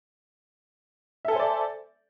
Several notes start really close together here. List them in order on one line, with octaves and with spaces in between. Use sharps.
E5 A4 G#5 C5 D5